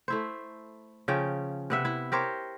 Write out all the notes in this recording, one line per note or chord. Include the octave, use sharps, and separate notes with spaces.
A3 E4 C5
C#3 F3 C#4 G5
C3 B3 E5
E4
G4 A#4 C5 C#5